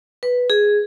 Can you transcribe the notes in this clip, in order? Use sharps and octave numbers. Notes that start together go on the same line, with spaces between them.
B4
G#4